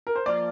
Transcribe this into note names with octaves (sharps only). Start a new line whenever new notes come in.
A#4
C5
F3 A#3 F4 D5